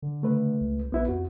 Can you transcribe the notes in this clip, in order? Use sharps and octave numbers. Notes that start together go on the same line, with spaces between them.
D3
C#3 A3 B4
C#2
A#1 B3 E4 B4
F2 F#4